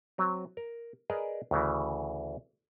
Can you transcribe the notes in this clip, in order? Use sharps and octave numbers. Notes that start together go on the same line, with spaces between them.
F#3 C4
A#4
G#4 A#4 B4 D5 D#5
D2 C#3 E3